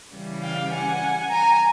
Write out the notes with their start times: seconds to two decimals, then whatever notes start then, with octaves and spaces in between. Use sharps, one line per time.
0.12 C#3 E3 G3
0.42 F5 G5
0.71 F#5 G#5
1.30 G#5 A#5